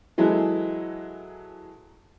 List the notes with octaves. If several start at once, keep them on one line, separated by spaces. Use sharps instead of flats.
E3 F#3 G#3 E4 A4